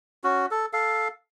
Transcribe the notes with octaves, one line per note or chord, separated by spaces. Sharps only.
C#4 F#4
A4
A4 F5